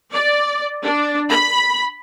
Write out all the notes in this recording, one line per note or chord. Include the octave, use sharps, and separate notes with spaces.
D5
D4
B5